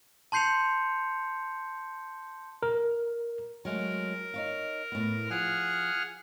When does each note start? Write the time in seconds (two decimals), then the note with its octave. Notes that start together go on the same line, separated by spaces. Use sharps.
0.32 A5 C6 G6 C7 C#7 F7
2.63 A#4
3.65 F#3 G#3 A3 A#4
4.34 D#4 C#5 F5
4.92 A2 B3
5.30 F3 G#4 F#5 F6